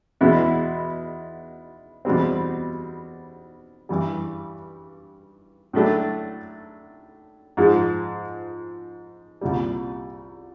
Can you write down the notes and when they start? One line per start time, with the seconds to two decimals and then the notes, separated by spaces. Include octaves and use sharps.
0.21 E2 B2 G#3 B3 E4
2.05 E2 B2 G3 C4
3.89 G2 E3 G3
5.73 A2 F#3 A3 D4
7.57 G#2 F3 G#3
9.41 C2 A#2 G3